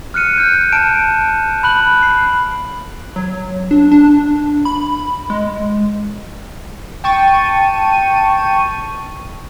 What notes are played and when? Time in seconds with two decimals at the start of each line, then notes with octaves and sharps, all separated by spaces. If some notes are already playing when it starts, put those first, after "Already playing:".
0.14 F6 F#6 C#7 D#7
0.38 F6 G6
0.72 A5 D7 E7
1.63 B5 F#6 F#7
2.03 C7
3.16 F#3
3.71 D4
3.92 D4
4.65 B5
5.30 G#3
7.04 G5 A5 C#6 D#7